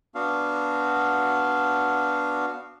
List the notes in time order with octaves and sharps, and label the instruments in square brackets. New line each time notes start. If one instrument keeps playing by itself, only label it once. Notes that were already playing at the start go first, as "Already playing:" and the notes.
[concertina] B3 D4 F#4 F5